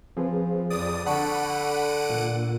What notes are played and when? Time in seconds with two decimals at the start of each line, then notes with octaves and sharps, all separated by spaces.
0.17 F3 C4 G#4 B4
0.70 F2 D5 D#6
1.06 D3 F#5 A5 B5 C#6 D7 D#7
2.10 A#2 A#3